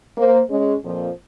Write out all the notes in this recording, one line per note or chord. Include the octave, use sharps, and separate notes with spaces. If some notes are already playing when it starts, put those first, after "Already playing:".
A#3 C5
G#3 C#4
F2 A#2 F3